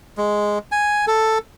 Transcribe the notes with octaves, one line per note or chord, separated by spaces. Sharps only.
G#3
G#5
A4